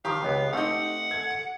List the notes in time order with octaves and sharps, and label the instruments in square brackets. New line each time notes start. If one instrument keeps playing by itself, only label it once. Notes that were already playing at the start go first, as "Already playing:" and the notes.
[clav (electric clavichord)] D#3 F3 [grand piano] G4 [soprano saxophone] F5
[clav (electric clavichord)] C#2 B3 G#5
[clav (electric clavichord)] A3 C4 D#5 [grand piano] D#4 G4 [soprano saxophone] F#5
[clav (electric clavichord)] A4 [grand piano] G#6
[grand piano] C#7